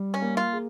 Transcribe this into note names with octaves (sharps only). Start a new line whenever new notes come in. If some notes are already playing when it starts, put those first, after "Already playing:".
Already playing: G3
C#4
A#3
F4
G#4